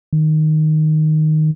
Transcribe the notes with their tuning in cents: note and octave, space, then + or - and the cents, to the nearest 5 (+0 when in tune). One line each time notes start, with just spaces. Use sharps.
D#3 -5